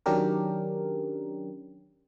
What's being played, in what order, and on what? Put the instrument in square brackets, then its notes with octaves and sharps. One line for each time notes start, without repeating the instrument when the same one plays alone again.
[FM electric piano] D#3 F#3 C#4 D4 G4 A#4